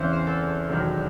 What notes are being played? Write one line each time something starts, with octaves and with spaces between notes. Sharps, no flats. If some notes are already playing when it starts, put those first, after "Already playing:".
Already playing: E2 C#3 E3 C4 E4 C5
C5
A4
E1 D#2 D#3 F#3